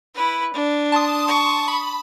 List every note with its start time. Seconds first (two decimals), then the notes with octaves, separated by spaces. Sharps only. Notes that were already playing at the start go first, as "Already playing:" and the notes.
0.15 E4 B4
0.54 D4
0.92 A5 C6 D#6
1.28 C#6
1.68 B5